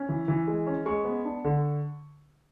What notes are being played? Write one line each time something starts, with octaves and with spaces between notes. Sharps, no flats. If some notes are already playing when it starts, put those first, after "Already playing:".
Already playing: C#4
E3
E3
G#3
C#4
G#3 C#6
B3
D4
D3